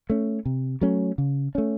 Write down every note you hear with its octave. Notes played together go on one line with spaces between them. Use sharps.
A3 C#4
C3
F#3 A3 C#4
C#3
A3 C#4